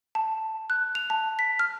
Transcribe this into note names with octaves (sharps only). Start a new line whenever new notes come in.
A5
F#6
F7
A5
B6
F6